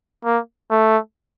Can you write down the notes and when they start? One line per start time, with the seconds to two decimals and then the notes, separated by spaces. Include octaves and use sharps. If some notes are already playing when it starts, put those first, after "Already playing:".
0.25 A#3
0.70 A3